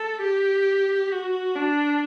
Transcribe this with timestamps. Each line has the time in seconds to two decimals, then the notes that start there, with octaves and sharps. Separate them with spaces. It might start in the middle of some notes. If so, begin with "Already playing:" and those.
Already playing: A4
0.23 G4
1.11 F#4
1.55 D4